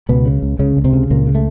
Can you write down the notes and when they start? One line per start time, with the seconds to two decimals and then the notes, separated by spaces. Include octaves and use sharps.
0.09 C#2 B2 B3
0.25 C#3
0.42 C#2
0.59 C#2 C#3 C#4
0.77 C#2
0.84 C3 C4
0.93 C#3
1.10 C#2 A#2 A#3
1.27 C#3
1.35 A3